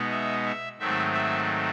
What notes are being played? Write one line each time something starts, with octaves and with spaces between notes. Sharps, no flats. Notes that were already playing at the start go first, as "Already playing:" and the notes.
Already playing: B2 G#3 B3 D#4
E5
E5
G#2 D#3 F#3 A3 C4 E5
E5